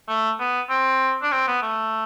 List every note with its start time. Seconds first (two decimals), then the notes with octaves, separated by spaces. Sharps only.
0.08 A3
0.39 B3
0.70 C4
1.22 D4
1.32 C4
1.47 B3
1.62 A3